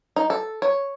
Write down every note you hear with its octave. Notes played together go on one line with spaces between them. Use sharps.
D#4
A4
C#5